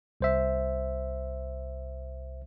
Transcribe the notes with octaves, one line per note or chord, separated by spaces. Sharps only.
C2 C5 E5